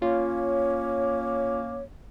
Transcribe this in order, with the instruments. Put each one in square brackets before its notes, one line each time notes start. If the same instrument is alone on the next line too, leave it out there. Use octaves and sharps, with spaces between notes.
[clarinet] A#3 [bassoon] C#4 [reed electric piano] F4 [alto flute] C#5